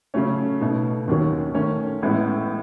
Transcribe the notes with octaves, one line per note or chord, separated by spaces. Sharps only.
C#3 F#3 A3 C#4
B2 A3 D#4
D#2 D#3 F#3 C#4
D#3 A3 C#4
A1 A2 G#3 B3 E4